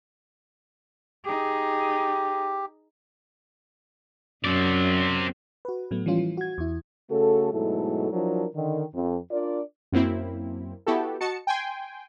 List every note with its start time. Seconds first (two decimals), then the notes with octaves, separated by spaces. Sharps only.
1.25 D#4 G4 G#4
4.45 F#2 C4 D5
5.65 F#4 B4
5.91 A2 F#3 A3 B3
6.06 E3 F3 G3 C#4 F4
6.18 E3
6.37 F#4 G#6
6.58 E2 E4
7.10 C#3 A3 F#4 A4
7.52 G#2 B2 F#3 A3 E4 A4
8.12 F3 F#3 D4 E4 A#4
8.55 D3 D#3
8.94 F2
9.31 D4 F4 A#4 D5
9.92 F#2 A#3 C4 E4
10.86 B3 E4 F#4 G4 A4
11.21 F#4 D#5 A5 C#7
11.47 G5 G#5 C6